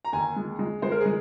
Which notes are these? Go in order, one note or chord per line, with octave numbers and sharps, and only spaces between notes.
A#5
D#2 G#5
G#3
G#3
G#3 C5
A#4
G#4
G#3